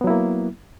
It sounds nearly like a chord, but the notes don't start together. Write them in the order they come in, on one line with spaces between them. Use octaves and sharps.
B3 F#3 E4 A#3